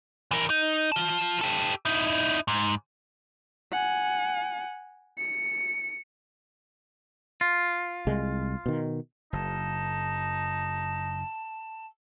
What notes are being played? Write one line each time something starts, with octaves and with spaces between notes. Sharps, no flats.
E3 A#4
D#4
F4 A5
G4 A4
D#4 E4
G#2
F#5 G#5
C#7
F4
C2 G#3
B2 D#3
F#1 D#4 A5